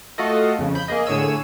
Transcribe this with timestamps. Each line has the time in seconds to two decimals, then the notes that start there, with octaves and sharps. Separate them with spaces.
0.18 A3 F4 F#4 A4 D#5
0.59 F2 C#3
0.75 B5 G6
0.88 A#3 G#4 D#5
1.06 A2 D3 G#4 C#5 E6 D#7